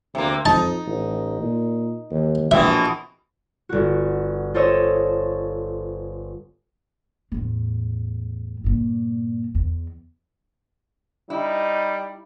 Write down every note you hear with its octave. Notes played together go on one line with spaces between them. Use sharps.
D2 C3 A#3
F2 D#4 A5
A1
A#2
D#2
A#1 B2 E3 C4 E5
G1 F#4
F4 A4 C5 C#5 D#5 E6
E2 A2
G2 A#2
E2
G3 D#4 E4